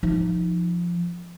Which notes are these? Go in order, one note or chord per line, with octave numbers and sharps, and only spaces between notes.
F3 D#4